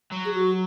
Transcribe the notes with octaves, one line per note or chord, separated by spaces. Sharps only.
F#3
G#4
F#4